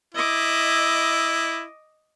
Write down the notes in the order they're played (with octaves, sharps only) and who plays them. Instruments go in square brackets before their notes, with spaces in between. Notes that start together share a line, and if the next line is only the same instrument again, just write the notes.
[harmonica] E4 [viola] D#5 D6